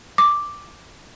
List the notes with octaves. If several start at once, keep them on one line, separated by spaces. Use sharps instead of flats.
D6